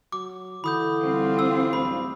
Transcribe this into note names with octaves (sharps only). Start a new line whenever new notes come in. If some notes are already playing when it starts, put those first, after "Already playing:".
F#3 D6
D3 E3 B5 D#6 G6
G3 C4 F4
E6
D1 B5